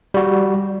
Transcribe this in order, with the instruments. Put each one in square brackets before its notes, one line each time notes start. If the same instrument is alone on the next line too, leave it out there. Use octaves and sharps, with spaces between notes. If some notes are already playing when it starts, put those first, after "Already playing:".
[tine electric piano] G3 F#4